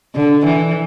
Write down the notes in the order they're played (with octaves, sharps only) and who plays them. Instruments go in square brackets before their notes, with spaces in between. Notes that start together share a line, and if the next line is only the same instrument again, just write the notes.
[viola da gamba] D3
E3